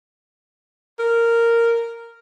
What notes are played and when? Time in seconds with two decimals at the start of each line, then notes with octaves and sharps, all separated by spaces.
0.99 A#4